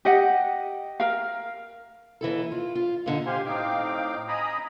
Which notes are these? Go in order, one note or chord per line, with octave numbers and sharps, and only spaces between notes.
G4 D#5 F#5
A#4 F5
D#2 E3 E4 A4
F4
F4
A#2 D3 D#4
G4 C5 F5 G#5 C6
A2 C4 D#4 F5 G5 D6
D#5 G#5 A#5 B5 D#6